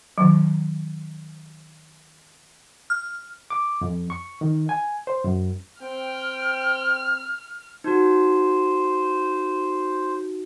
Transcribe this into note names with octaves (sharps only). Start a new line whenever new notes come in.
D#3 F#3
F6
D6
F2
C#6
D#3
G#5
C5
F#2
C4 G5 F6
D#4 F#4 C5